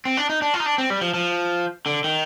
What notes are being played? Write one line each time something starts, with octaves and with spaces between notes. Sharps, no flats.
C4
D4
D#4
D4
F4
D#4
D4
C4
G3
F3
F3
D3
D#3